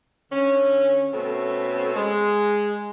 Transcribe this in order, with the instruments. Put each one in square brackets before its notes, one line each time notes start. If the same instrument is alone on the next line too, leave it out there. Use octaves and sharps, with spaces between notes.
[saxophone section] D3 C#4
B2 A3 C4 C#4 A4
G#3